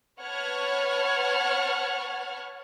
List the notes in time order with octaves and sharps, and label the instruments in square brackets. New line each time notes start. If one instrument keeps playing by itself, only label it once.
[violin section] B4 C#5 F#5 A5 F6 G#6